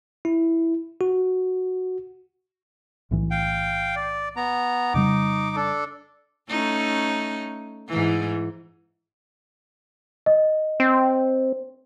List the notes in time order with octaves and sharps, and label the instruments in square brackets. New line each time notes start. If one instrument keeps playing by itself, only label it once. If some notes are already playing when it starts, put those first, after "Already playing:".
[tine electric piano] E4
F#4
[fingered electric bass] B1 A2 E3
[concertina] F5 G5
D5
B3 A#5
[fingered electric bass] F2 C#3 G3 [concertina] D#4 D6
[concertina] D4 A4
[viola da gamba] A3 C#4 D#4
G#2 E3
[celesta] D#5
[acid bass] C4